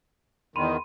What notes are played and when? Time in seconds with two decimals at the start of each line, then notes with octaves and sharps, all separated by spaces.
0.56 E2 D#3 B5 C6 D#7